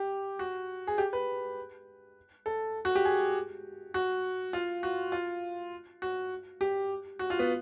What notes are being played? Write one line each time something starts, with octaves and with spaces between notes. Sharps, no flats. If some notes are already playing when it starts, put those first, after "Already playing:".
Already playing: G4
F#4
G#4
G4
B4
A4
F#4
G4
G#4
F#4
F4
F#4
F4
F#4
G4
F#4
F4
B3